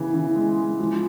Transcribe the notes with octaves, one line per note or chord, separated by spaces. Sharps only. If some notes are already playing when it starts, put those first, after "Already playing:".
Already playing: C#3 E3 B3
E3
G#3
G#3
F3